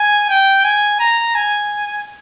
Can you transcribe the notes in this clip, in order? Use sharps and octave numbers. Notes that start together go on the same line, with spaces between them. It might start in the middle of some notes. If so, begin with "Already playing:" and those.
Already playing: G#5
G5
G#5
A#5
G#5